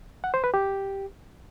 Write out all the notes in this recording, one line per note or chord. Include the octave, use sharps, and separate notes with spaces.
F#5
C5
B4
G4